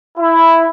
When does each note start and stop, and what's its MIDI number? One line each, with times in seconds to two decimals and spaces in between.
0.18 0.68 64